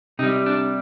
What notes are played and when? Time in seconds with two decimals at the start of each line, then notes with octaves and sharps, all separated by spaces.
0.19 C3 D#4
0.23 G3
0.46 D4